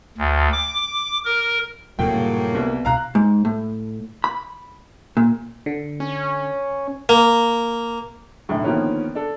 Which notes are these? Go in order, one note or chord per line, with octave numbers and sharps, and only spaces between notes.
D2
D6
A#4
D#1 F2 A2 C3 F#3 A#3 G5
G2 A#2 C#3
C2 B3
C2 B2 F5 A#5 F#6
G#2
A2
B5
A#2
D3
C#4
A#3
B1 F#2 A2 D3
D3 D#3 F3 A#3 B3 C#4
D4 A4